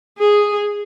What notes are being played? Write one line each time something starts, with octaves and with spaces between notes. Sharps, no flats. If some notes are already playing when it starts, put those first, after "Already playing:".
G#4